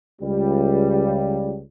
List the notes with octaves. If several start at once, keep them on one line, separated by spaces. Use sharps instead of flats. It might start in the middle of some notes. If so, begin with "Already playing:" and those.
C#2 G3